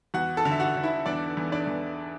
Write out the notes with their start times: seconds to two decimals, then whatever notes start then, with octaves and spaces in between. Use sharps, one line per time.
0.14 E2 F#4 F#5
0.37 A4 A5
0.45 D3
0.52 E5
0.60 F#4 F#5
0.76 D3
0.83 E4 E5
1.06 E2 D4 D5
1.37 E2
1.52 D4 D5
1.67 E2